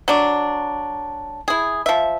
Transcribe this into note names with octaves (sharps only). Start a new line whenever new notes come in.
F#3 D4
E4 G#4
F3 E5